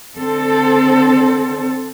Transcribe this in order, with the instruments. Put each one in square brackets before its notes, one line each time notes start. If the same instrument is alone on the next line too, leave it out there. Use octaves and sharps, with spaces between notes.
[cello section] D3 C4 A4 C5